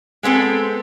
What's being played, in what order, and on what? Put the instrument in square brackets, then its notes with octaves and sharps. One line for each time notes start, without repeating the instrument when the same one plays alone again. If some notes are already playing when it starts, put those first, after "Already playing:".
[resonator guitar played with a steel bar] G#3 B3 C4 A4